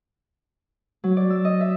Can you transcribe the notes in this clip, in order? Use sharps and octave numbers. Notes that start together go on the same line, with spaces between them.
F#3
D5
E6
D#5
E5